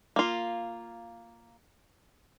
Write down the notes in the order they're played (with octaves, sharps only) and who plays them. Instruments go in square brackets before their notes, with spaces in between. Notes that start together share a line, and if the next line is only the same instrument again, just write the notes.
[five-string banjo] A#3 F4